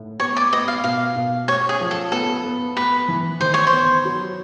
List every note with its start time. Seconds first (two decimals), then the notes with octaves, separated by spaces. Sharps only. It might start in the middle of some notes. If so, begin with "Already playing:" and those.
Already playing: A2
0.20 B3 C#5
0.37 D5
0.53 B3 D#5
0.68 F5
0.84 B2 F5
1.16 B2
1.48 C#4 C#5
1.69 G#4
1.80 F3
1.91 A4
2.12 B3 A4
2.45 B3
2.77 B3 B4
3.08 E3
3.40 D#3 C5
3.54 C#5
3.67 C5
3.72 B3
4.05 F#3